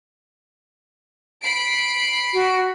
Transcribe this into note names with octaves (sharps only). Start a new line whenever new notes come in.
B5 C7 D7
F#4